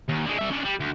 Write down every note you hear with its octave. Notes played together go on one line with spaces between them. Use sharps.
D#2
D3 G#3
G3 E5
C#4 D4
G3
D2